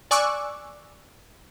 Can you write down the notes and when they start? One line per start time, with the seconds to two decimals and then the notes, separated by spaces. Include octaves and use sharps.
0.11 D5 G#5 C#6 D6 E6 F#6